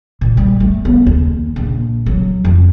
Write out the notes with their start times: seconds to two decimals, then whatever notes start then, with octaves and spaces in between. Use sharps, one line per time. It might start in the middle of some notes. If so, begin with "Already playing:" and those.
0.21 A#2
0.37 G3
0.60 A3
0.85 B3
1.07 D#2
1.56 A#1
2.06 F#3
2.44 F2